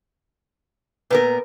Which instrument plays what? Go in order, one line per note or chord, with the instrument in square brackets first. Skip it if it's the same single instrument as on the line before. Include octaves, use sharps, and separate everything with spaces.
[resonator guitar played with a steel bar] A#2 B3 A#4 [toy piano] B4